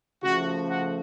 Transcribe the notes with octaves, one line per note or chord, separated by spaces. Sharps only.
C#3 F3 A3 F#4
F#4